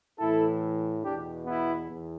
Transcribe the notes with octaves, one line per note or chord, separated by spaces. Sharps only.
A2 E3 E4 A4
E2 B2 D4 G4
B3 E4
E2